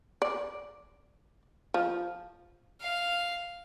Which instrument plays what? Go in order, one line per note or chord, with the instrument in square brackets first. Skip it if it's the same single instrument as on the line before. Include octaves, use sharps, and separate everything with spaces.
[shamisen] D5
F3
[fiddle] F5